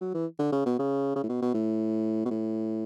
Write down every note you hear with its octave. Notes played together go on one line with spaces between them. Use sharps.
F#3
E3
D3
C#3
B2
C#3
C#3
A2
B2
B2
A2
B2
A2